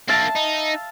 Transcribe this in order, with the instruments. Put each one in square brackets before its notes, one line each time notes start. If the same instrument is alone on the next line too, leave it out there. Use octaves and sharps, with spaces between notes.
[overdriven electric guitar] A#3 D4 [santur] E5 F5 A5
[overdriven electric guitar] D#4